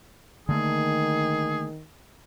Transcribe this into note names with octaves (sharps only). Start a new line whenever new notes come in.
D3 D#3 A3 A#3 G#4